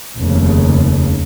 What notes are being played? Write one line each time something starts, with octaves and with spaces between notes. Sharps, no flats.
F1 D#2 C#3